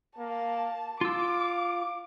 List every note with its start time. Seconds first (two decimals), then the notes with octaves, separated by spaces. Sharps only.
0.18 A#3 A5
1.01 F4 F5 D6 E6